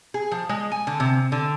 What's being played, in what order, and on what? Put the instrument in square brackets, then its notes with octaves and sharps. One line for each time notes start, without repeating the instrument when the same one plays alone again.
[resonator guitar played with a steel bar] G#4
F3
G#3
G#5
D3
C3
D3